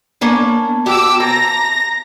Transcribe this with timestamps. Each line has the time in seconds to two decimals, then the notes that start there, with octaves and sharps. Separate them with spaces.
0.21 A#3 B3 C#4 D4 A5
0.86 F#4 G4 D6 E6
1.20 C3 A#5 A#6